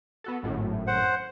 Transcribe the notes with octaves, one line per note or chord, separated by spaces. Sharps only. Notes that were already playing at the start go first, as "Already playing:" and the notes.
B3 F#4 A4
G#1 F#2 A2
C5 F#5